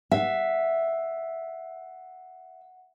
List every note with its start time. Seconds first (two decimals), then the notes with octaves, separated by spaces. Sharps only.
0.12 E5 F#5